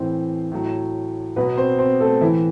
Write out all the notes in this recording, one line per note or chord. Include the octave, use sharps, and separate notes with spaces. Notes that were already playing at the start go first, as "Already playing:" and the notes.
Already playing: A2 E3 C4 C5
A2 F#3
B2 F#3 B3 B4
C4 C5
C4 C5
A3 A4
A2 E3 E4